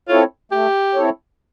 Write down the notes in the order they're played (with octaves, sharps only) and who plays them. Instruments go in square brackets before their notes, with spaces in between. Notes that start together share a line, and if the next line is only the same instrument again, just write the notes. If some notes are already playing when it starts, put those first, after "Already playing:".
[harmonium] C4 E4 A4 C#5 [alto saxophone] F4
[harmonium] A3 [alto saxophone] G4
[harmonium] C4 E4 A4 C#5